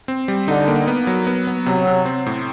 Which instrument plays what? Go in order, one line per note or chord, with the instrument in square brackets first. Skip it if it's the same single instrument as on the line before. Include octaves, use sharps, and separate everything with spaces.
[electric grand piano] C4
G3
[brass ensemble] D3 [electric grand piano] D#4
[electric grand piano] A#3
B3
F#3
B3
B3
[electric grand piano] C3 [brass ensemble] F#3
[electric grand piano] C3
C4
A2